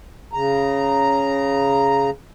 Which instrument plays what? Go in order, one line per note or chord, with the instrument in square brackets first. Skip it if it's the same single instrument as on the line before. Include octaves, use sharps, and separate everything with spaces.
[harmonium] C#3 A#5